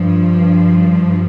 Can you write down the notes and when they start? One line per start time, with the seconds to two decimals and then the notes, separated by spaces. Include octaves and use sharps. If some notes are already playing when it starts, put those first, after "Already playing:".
Already playing: G2 F3